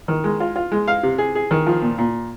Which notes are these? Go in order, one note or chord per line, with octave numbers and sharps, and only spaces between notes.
D#3
G#3
F4
F4
G#3
F5
C3
G#4
G#4
D#3
F3
A#2
A#2